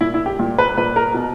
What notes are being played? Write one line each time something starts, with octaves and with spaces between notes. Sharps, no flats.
A#2 E4
E4
G4
A#2
B4
A#2 B4
A#4
B2